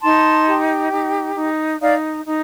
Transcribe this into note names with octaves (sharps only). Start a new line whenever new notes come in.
D#4 A5 C6
G4
D#4
D#4
D#4 D5 F5
D#4